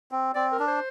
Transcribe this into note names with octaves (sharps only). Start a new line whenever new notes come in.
C4
C4 D5
A#4
D4
C5